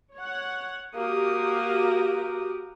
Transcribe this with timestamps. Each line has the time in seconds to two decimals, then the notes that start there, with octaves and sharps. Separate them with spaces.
0.15 C#5 F#5
0.95 A#3 F#4 G4 A#4 D#6